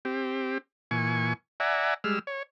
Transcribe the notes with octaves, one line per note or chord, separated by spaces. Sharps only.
C4 G4
A#2 E3 G#5 C#6
D5 E5 F#5 G#5 A#5
G3 G#3 E6 F6
C#5